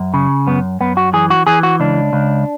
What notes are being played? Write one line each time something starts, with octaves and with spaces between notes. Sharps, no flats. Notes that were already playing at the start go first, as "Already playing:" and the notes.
Already playing: F#2
C#3
F#2 B3
F#2 B3
F#4
E3 G#4
F#4
E3 G#4
F#4
C#2 D4
C#2